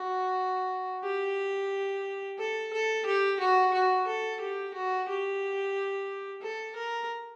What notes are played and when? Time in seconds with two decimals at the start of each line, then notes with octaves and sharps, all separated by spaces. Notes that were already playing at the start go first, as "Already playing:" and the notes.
Already playing: F#4
1.04 G4
2.38 A4
2.73 A4
3.05 G4
3.40 F#4
3.73 F#4
4.07 A4
4.40 G4
4.74 F#4
5.08 G4
6.42 A4
6.76 A#4